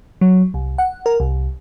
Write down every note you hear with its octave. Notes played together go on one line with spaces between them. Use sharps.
F#3
C2
F#5
A#4
C2